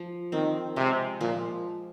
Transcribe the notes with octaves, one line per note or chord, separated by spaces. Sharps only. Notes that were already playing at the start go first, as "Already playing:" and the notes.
Already playing: F3
D#3 C4
C3 G#3
A#2 F3